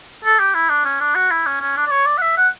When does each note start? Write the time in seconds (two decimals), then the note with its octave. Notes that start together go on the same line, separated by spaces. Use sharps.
0.25 A4
0.39 G4
0.54 E4
0.70 D4
0.85 C#4
1.00 D4
1.15 F#4
1.31 E4
1.46 C#4
1.61 C#4
1.76 D4
1.87 D5
1.91 C#5
2.06 D5
2.18 F#5
2.22 E5
2.37 F#5